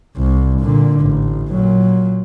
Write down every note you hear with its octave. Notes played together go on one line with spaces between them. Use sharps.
C2
A#2 D3
A1
A#2 F#3